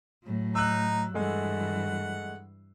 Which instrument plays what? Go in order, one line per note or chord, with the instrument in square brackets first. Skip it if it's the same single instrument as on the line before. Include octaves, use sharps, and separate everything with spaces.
[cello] A2 F#3
[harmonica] D#4 [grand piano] E6 F#6
[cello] G2 E3 [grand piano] G#3 A3 [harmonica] F#5